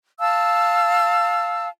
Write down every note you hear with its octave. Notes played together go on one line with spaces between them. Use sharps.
F5 A5 E6